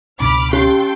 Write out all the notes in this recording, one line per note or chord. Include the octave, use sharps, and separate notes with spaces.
C#2 B2 D4 B5 D6 F6
C#4 G4 A4 G5 C6